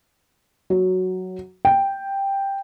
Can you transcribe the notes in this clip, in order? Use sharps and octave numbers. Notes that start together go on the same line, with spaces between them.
F#3
G5